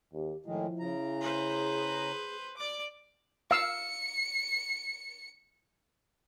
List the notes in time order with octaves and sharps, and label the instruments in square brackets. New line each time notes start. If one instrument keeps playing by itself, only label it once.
[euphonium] D#2 [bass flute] G4
[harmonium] A2 D#3 G#3 [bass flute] F3 [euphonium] E4
[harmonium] C#3 A#5
[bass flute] G#4 [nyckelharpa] B4 C5
[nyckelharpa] D5 D6
[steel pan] F5 E6 [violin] C#7